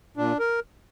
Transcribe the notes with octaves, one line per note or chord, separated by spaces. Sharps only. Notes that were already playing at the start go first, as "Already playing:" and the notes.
A#2 D4
A#4